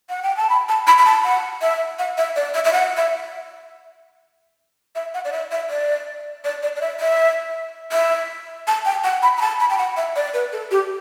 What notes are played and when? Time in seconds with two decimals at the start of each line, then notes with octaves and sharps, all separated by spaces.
0.10 F#5
0.23 G5
0.37 A5
0.50 B5
0.69 A5
0.87 B5
0.98 B5
1.06 A5
1.25 F#5
1.62 E5
1.99 F#5
2.18 E5
2.36 D5
2.54 E5
2.65 E5
2.73 F#5
2.97 E5
4.95 E5
5.14 F#5
5.25 D5
5.32 E5
5.51 E5
5.70 D5
6.44 D5
6.63 D5
6.76 D5
6.81 E5
7.00 E5
7.92 E5
8.67 A5
8.85 G5
9.04 F#5
9.23 B5
9.37 B5
9.41 A5
9.60 B5
9.70 G5
9.78 F#5
9.97 E5
10.16 D5
10.34 B4
10.52 A4
10.71 G4